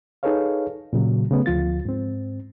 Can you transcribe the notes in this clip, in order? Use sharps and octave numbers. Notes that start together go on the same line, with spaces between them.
D#4 G#4 A4 B4 C#5 F5
A#2 C#3 F#3
C#3 A3 B3
D2 F3 F4 A6
G#2 C4